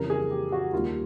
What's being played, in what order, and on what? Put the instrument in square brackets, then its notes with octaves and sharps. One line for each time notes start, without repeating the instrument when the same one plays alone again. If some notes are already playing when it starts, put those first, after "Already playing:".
Already playing: [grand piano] F2 C#3 E3 G3 A#4
G#4
G4
F#4
D#2 D#3 G3 F4